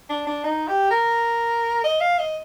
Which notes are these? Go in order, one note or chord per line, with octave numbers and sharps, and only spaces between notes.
D4
D4
D#4
G4
A#4
D#5
F5
D#5